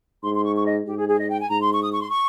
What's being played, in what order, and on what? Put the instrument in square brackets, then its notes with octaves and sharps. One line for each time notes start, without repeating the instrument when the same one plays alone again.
[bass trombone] G#2 [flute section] C6
[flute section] C6
C#6
C#6
D#5
[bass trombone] G#2 [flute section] G4
[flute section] G#4
G#4
D#5
G5
G#5
[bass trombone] G#2 [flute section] A#5
[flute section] C6
C#6
D#6
C#6
C6
C#6